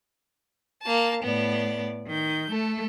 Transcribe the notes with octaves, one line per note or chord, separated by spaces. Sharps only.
A#3 A5
A2 B3 D5
D#3 G6
A3 A4